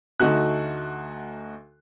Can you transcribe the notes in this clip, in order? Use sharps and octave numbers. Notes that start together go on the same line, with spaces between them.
D2 A3 D#4 F#4 F#6